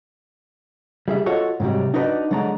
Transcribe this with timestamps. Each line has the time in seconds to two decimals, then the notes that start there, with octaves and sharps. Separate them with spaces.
1.08 G3 G#4 E5
1.26 F4 F#4 A4 C#5 D#5 F#5
1.60 G#2 C3 F#3 G3
1.94 D4 D#4 F#4 B4 C#5 D5
2.31 D3 F#3 G#3 D5 A5 A#5